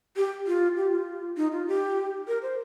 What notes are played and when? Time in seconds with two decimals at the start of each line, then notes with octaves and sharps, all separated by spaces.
0.17 G4
0.47 F4
0.77 G4
0.92 F4
1.37 D#4
1.52 F4
1.68 G4
2.28 A#4
2.42 C5